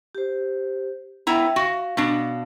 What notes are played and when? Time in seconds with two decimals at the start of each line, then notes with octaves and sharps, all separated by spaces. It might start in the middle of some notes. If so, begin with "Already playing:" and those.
0.15 G4 C5
1.27 B3 E4 E5 G5 A#5
1.56 F#4 F5
1.97 B2 D4